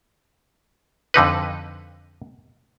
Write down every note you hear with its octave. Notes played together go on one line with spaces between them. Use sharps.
F2 D3 D#4 B4